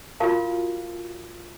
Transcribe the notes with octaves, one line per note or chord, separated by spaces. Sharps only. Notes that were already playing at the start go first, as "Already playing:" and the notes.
F4 F#4 A#4 F5 A5